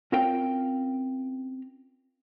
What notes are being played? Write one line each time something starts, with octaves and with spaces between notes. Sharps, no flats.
C4 C#4 F4 A#4 F5 G5